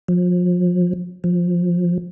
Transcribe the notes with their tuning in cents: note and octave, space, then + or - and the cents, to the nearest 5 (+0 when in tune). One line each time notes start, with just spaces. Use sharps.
F3 +35
F3 +15